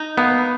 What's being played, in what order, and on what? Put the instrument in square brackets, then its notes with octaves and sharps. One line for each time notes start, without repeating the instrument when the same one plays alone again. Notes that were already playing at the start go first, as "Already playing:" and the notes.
Already playing: [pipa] D#4
[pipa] A#3 [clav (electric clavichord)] B3